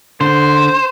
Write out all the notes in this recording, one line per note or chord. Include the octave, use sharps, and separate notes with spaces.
D3 C5